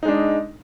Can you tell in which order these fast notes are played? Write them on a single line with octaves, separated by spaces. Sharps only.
D#4 G#3 D4